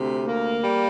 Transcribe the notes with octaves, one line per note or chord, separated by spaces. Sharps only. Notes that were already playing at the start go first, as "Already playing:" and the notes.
Already playing: D2 C3
A#3
G3